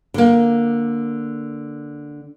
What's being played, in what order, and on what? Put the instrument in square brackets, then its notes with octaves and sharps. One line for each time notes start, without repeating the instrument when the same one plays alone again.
[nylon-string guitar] D3 A#3